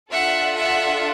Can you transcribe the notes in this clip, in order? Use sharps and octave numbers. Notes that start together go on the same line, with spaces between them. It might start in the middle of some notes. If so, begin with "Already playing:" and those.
D4 F4 A4 E5 F#5
E5 F#5